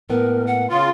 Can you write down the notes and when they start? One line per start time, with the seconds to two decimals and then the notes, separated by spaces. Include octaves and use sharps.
0.10 A2 A#3 B3 A#4
0.47 F#5
0.70 C#3 F4 C6